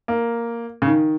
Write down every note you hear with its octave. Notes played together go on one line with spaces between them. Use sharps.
A#3
C#3
D#3